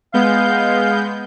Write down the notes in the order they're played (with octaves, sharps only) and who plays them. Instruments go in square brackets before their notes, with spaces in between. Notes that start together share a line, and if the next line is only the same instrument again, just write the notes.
[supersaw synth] G#3 B3 G6 [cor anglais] F5